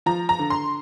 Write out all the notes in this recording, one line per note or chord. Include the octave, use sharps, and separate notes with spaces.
F3 A#5
A#5
D3
C6